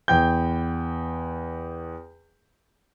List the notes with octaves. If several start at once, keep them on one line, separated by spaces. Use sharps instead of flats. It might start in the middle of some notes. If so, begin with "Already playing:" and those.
E2 G5 G6